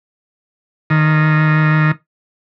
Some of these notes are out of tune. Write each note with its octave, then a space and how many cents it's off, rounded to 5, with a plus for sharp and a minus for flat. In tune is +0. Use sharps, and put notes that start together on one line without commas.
D#3 -10